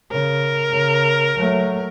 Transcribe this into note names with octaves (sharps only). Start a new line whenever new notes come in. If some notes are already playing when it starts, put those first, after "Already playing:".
C#3 A#4
C#3
F#3 A3